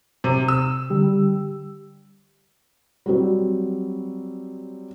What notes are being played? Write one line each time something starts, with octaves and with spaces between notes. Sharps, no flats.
C3
E6
D3 G3 G4
F#3 G3 C4